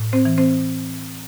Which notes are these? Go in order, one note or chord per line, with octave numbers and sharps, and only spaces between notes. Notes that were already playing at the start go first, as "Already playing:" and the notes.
Already playing: A2
C4 C5
E3
C4 C5